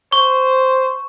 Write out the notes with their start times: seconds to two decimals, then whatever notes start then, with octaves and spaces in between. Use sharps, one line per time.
0.12 C5 C#6